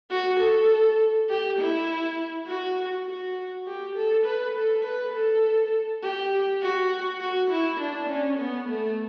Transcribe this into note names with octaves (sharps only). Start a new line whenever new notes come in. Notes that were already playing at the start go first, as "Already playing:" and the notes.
F#4
A4
G4
E4
F#4
F#4
G4
A4
B4
A4
B4
A4
G4
F#4
F#4
E4
D4
C#4
B3
A3